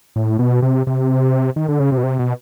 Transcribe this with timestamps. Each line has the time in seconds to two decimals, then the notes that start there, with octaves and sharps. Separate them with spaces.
0.16 A2
0.39 B2
0.62 C3
0.87 C3
1.56 D#3
1.68 D3
1.80 C#3
1.92 C3
1.98 B2
2.03 C3
2.19 B2